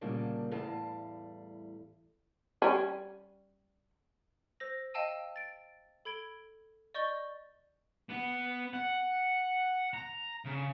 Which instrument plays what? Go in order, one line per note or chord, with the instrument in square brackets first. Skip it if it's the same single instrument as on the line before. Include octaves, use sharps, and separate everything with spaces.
[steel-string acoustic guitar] D2 A#2 C#3 G3 A#3 A5
E2 A2 E3 G3 F5 A5
[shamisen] G3 C#4
[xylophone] C5 E6 A#6
D#5 F5 G5 A5 E6 D#7
A6 D7
A4 B5 G#6 D7 G7
D5 D#5 C#6 G6 A6 G7
[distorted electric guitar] B3
F#5
A#5
C#3